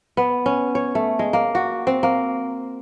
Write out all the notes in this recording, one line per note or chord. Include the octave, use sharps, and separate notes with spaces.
B3
C#4
C#5
A3
G#3
A#3
F#4
C4
A#3